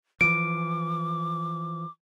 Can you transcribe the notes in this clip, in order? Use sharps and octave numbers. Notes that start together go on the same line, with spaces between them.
E3 F3 D6 D7